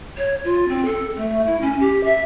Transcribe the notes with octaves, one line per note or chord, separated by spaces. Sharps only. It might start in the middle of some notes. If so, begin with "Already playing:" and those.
C#5
F4
C4
A4
A3
E4
C#4
G4
E5